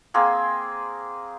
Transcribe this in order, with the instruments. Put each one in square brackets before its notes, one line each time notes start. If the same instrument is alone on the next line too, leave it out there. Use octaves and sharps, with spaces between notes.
[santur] A#3 C4 G#4